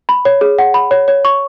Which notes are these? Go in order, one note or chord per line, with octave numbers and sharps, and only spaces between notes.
B5
C#5
G#4
F#5
B5
C#5
C#5
C#6